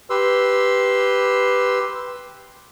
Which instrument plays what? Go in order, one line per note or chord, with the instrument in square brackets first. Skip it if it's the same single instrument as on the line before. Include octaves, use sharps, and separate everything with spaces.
[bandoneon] G4 B4 C6 E6